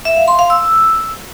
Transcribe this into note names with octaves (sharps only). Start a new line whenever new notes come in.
E5
F5
C6
F5
E6